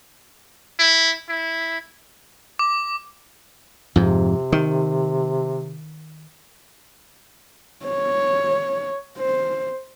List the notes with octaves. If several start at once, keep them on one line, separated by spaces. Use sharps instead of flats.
E4
E4
D6
F2 G#2 C3
D#3
C#5
C5